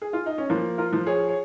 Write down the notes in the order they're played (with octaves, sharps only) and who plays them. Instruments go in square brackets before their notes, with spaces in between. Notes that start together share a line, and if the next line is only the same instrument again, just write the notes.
[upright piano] G#4
F4
D#4
C#4
F3 A#3
F4 A#4
F3
G#4 C#5
C#5